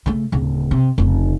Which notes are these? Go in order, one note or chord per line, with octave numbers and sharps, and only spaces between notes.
C#3 A3
D1 C#3
C3
F1 C#3